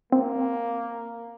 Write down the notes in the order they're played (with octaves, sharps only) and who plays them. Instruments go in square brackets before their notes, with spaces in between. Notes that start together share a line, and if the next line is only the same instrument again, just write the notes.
[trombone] A#3 [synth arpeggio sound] C4